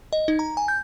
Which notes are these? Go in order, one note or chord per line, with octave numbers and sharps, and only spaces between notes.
D#5
D#4
A#5
G#5
G6